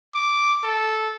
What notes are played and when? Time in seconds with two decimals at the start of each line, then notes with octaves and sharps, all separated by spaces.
0.14 D6
0.63 A4